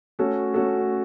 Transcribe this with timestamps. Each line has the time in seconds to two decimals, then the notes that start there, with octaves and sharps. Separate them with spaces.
0.19 A3 C#4 F#4 A4
0.54 A3 C#4 F#4 A4